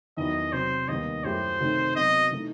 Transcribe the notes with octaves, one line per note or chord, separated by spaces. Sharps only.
E2 D#3 F#3 B3 E4 D#5
C3 F#3 C4 C5
D#2 D#3 G3 B3 D#4 D#5
F#2 F#3 A3 E4 G4 C5
C3 D#3 A3 D#4
C3 F#3 B3 F#4 D#5
E3 A3 D#4